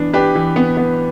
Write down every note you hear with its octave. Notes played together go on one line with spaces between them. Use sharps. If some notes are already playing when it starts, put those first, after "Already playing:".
Already playing: E3 B3 D4
D4 G4 B4
E3
B3
B3